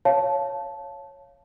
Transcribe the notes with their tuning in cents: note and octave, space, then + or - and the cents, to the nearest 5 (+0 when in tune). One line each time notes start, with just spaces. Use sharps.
C#5 +0 F5 -10 A5 -10